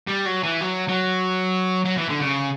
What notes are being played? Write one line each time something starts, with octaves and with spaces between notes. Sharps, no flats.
G3
F#3
E3
F#3
F#3
F#3
E3
D3
C#3